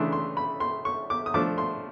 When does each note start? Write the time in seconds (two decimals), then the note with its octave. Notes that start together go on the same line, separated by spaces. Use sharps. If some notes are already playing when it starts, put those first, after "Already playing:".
Already playing: C#3 E3 A3 D4 C6
0.12 C6
0.37 B5
0.60 C6
0.85 C#6
1.10 D6
1.26 D#6
1.34 F3 A3 D4 D6
1.58 C6